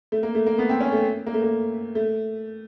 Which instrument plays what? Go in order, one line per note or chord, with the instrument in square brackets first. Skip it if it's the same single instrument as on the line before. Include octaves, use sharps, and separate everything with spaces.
[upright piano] A3
A#3
A3
A#3
B3
C4
C#4
A3
A#3
A3
A#3
A3